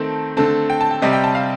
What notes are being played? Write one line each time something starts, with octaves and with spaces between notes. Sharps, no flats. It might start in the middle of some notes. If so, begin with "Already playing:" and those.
Already playing: D#3 A3 C4 A5
D3 A3 C4 A5
G5
A5
G5
C3 G3 C4 D#5
G5
A5
F5